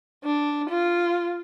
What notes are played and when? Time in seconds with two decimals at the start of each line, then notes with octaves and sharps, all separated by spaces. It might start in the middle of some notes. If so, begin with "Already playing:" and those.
0.24 D4
0.69 F4